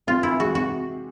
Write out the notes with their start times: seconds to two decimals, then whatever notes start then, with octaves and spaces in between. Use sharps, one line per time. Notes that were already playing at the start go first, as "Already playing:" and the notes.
0.07 C4 F4
0.23 E3 E4
0.39 G#3 F#4
0.55 C3 F#4